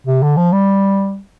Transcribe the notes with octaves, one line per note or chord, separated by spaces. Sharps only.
C3
D3
F3
G3